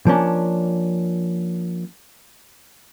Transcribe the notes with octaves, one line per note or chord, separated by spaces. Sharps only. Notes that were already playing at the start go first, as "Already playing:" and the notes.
F3 A#3 C#4 D4